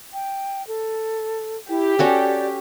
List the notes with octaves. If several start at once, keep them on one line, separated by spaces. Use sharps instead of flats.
G5
A4
E4 G4
C#4 F#4 A4 D5